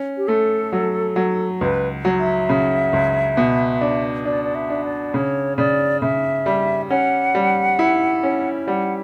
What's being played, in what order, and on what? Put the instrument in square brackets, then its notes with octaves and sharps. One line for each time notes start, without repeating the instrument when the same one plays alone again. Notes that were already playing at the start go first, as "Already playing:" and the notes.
Already playing: [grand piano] C#4
[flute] G4
[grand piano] A3 [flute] A4
[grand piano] F#3
F#3
[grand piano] C#2 [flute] B4
[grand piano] F#3
[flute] E5
[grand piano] C#3
C#2
B2
D4
[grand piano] D4 [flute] D5
[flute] D5
E5
[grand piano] D4
[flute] D5
[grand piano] C#3 [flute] C#5
[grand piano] C#3 [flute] D5
[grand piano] C#3 [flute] E5
[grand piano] G3
[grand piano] C#4 [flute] F#5
[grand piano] G3
E4
C#4
[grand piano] G3 [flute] F#5